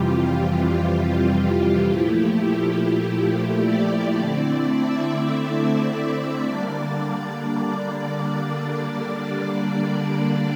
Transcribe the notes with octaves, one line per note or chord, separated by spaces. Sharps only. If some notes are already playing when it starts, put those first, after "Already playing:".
Already playing: F2 C3 E3 G3 F4 G4
F4
G4
A#2 F3 A3 E4
G4
D5
D3 A3 C4 E4
E5
D5
D3 G3 A#3 D4 D5